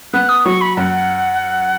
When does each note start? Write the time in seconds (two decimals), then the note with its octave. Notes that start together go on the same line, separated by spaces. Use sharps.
0.14 B3 F#6
0.29 D#6
0.45 F#3 C#6
0.61 B5
0.77 F#2 F#5